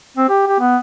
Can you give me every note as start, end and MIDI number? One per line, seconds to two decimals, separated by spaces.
0.17 0.29 60
0.29 0.45 67
0.47 0.59 67
0.60 0.77 59